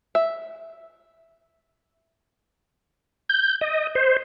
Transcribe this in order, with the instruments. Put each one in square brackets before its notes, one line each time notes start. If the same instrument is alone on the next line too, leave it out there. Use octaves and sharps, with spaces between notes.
[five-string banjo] E5
[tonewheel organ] G6
D#5
C5